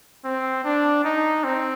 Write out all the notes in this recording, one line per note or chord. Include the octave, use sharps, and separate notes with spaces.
C4
D4
D#4
C4